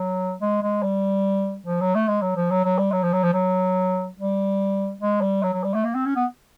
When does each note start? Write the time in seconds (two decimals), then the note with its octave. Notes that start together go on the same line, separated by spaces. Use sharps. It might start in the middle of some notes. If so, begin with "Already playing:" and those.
Already playing: F#3
0.41 G#3
0.62 G#3
0.83 G3
1.67 F3
1.81 F#3
1.95 A3
2.08 G#3
2.22 F#3
2.36 F3
2.51 F#3
2.64 F#3
2.79 G3
2.92 F#3
3.03 F3
3.13 F#3
3.24 F3
3.34 F#3
4.17 G3
5.01 G#3
5.21 G3
5.43 F#3
5.53 F#3
5.64 G3
5.75 A3
5.85 A#3
5.95 C4
6.06 C#4
6.16 B3